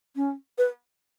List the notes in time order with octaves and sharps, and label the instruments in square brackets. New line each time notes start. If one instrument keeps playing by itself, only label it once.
[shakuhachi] C#4
B4